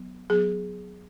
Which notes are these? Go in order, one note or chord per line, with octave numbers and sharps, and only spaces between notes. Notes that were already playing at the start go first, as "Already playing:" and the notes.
Already playing: F#3 B3
F#3 B3 G#4